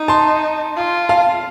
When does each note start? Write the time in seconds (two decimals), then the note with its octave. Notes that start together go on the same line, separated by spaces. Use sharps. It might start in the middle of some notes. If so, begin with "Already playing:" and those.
Already playing: D#4
0.08 A5 C6
0.76 F4
1.09 F5 A5